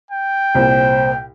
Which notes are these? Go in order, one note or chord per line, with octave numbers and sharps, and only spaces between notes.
G5
C2 A#2 C5